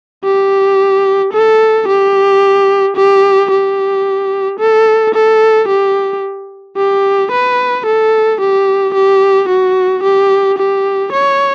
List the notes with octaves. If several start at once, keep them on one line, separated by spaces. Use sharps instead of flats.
G4
A4
G4
G4
G4
A4
A4
G4
G4
B4
A4
G4
G4
F#4
G4
G4
C#5